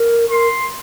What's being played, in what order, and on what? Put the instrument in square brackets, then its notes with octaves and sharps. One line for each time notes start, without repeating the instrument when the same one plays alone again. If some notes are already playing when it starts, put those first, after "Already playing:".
Already playing: [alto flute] A#4
[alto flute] A#4 [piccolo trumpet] C6